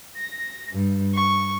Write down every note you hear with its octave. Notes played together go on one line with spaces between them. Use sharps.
A#6
G2
C#6